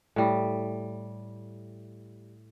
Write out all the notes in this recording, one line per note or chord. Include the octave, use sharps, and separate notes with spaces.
A2 G3